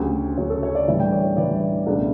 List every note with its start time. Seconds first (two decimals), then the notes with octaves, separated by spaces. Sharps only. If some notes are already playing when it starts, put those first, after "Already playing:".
Already playing: D2 C#3 F#3 G4
0.38 D2 C#3 F#3 C#5
0.50 A4
0.63 C#5
0.75 D5
0.87 A2 E3 G3 D4 E5
1.00 G5
1.13 C#5
1.24 C#5
1.37 A2 E3 G3 D4 D5
1.86 C#2 B2 A3 D4